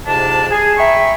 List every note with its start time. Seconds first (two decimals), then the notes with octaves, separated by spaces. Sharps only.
0.06 F2 G#2 C3 D4 A5
0.51 G#4
0.78 E5 G5 A#5 B5 C#6